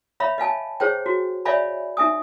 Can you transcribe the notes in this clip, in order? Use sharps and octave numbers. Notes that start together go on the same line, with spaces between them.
C#5 E5 F5 B5
D#5 F5 G#5 A5
G#4 C5 C#5 G5
F#4
C#5 D5 E5 F5 G#5 B5
D#4 E5 G#5 D#6